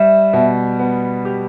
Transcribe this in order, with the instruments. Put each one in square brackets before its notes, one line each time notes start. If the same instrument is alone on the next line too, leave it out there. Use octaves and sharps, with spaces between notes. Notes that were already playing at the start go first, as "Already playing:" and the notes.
Already playing: [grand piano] G3 [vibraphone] E5
[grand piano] B2
B3
G4